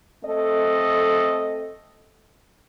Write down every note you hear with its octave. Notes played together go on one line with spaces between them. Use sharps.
A3 C4 A4 D#5